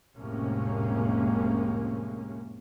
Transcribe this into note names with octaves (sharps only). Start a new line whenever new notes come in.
F1 A2 C3 G#3 A#3 C#4